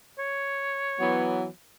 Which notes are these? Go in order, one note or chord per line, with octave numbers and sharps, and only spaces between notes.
C#5
E3 F#3 B3